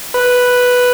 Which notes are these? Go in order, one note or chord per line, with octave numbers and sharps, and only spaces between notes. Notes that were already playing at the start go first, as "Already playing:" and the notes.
B4